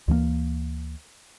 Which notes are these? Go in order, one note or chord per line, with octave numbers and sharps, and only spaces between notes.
D2 E3 A3 A#3